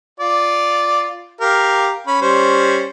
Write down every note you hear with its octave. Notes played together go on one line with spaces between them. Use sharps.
F4 D5
G4 A#4 F5
C#4 B5
G3 C#4 C5